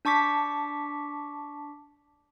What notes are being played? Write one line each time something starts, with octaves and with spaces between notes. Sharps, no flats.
D4 A5 C#6 D6 B6